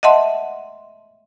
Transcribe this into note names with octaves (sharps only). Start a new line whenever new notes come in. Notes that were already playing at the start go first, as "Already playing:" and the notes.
D#5 E5 F#5 A5 C6